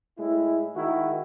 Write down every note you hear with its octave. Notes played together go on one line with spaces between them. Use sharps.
A2 G#3 E4
D#3 G#3 D#4 E4 F#4